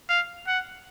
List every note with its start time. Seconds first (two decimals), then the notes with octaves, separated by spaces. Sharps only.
0.09 F5
0.47 F#5